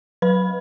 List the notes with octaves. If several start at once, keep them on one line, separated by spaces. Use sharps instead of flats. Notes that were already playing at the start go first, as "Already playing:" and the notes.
F#3 B4 B5